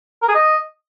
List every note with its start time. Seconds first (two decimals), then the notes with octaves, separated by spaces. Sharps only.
0.22 A#4
0.28 G#4
0.34 D#5